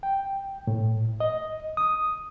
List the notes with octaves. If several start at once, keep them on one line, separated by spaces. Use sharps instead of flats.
G5
A2
D#5
D#6